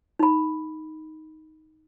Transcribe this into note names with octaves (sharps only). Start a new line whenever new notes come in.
D#4 B5